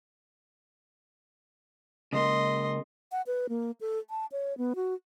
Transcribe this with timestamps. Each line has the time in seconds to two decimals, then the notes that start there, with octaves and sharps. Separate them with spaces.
2.13 C#3 G#3 A#3 D#5 C6
3.12 F#5
3.27 B4
3.49 A#3
3.81 A4
4.10 A5
4.32 C#5
4.58 B3
4.76 F#4